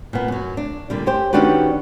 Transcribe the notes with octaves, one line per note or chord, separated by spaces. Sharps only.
A#2 B3
F#2 F#3
D4
A#2 D3 G3
C#4 G4 C5
D#3 C#4 D4 F#4 G4 B4